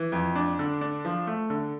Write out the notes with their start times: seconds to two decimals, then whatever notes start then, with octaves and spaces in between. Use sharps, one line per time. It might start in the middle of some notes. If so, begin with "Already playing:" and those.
Already playing: E3
0.12 F2
0.36 D4
0.59 D3
0.81 D4
1.05 F3
1.27 A3
1.50 D3